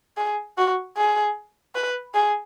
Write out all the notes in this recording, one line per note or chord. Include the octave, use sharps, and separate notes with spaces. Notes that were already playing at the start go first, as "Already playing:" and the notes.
G#4
F#4
G#4
B4
G#4